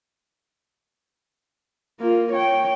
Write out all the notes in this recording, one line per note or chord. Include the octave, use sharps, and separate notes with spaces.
A#3 F4
C#5 G5